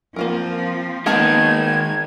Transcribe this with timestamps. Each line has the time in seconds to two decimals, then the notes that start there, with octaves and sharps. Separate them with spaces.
0.16 F3 A#3 C4 F4 A#4
1.06 D#3 G#3 A#3 B3 A#4 A5 G#6